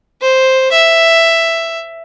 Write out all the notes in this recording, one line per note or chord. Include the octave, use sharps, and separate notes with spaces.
C5
E5